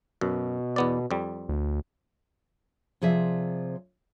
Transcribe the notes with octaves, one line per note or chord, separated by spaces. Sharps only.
F#2 B2
E2 B3 D5
F2 G3
D2
C3 F3 G#4 D5 E5